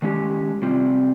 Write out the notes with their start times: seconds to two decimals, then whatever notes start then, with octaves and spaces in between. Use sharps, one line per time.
0.02 D#3 G#3 C#4 G4
0.62 C3 G3 C4 F4